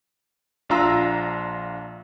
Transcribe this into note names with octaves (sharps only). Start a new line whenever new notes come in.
A#1 D4 F4 A#5 E6